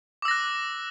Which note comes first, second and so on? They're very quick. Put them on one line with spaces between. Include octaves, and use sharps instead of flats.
D6 E6 A#6 F#6